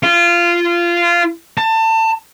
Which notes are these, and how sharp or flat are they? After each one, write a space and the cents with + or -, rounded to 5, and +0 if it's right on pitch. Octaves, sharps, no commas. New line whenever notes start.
F4 -20
A5 +25